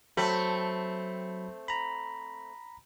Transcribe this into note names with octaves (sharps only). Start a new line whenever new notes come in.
F#3 A3 C4 B5
A#5 B5